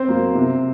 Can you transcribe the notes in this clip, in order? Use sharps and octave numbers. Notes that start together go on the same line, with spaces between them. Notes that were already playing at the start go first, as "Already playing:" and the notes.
Already playing: C4 C5
F#3 A#3
C3